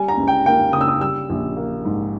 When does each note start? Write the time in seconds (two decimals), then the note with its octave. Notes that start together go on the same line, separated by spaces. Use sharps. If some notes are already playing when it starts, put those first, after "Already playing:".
Already playing: G3 G#5
0.08 A#5
0.17 C#2
0.28 G5
0.46 A#3 G5
0.73 C#3 D#6
0.81 E6
0.88 D#6
1.01 G3 E6
1.30 A#1
1.56 A#3
1.85 G#2